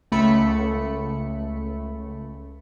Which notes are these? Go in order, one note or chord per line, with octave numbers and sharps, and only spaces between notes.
C#2 A3 B5 C#7